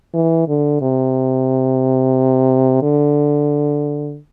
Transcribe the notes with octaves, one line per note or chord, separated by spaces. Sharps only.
E3
D3
C3
D3